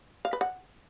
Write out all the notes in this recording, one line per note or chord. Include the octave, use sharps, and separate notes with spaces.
F5
B4
F#5